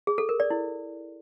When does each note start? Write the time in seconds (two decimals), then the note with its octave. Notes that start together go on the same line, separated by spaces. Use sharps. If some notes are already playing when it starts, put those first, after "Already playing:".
0.07 G#4
0.18 A4
0.29 A#4
0.40 D5
0.50 E4